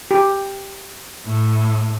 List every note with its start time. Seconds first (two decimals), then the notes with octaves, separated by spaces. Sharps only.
0.11 G4
1.26 A2